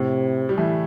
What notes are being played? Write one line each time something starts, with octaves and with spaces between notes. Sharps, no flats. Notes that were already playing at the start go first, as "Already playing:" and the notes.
Already playing: A2 C3
G3
E3 A3